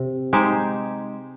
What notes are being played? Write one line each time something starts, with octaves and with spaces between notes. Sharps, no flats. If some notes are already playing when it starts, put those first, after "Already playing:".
Already playing: C3
G#3 D#4 G4 C5